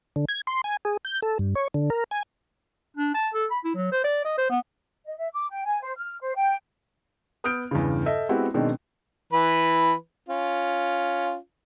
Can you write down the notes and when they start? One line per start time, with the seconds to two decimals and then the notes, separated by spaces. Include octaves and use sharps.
0.16 D3
0.29 G#6
0.47 C6
0.64 G#5
0.85 G#4
1.05 G6
1.23 A4
1.39 G2
1.55 C#5
1.74 D3
1.90 A#4
2.11 G#5
2.96 D4
3.14 A5
3.33 A4
3.50 B5
3.64 E4
3.75 F#3
3.92 C5
4.04 D5
4.25 D#5
4.38 C5
4.49 B3
5.06 D#5
5.18 E5
5.34 D6
5.50 G5
5.65 G#5
5.83 C5
5.97 F6
6.21 C5
6.37 G5
7.44 B3 D#6 F6 G6 D7
7.71 E2 G2 C#3
8.06 A4 D#5 E5
8.29 G#3 B3 C4 E4 F#4 G4
8.54 B2 D#3 G#3 C4 D4
9.33 E3 B4
10.29 C#4 F4